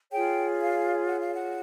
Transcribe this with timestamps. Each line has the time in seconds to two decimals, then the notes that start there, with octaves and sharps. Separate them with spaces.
0.11 F4 G#4 C#5 G5
0.59 F5
1.06 F#5
1.19 F5
1.32 F#5